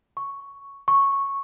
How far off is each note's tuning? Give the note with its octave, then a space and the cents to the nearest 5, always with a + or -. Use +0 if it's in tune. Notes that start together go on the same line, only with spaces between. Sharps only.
C#6 +5
C#6 -5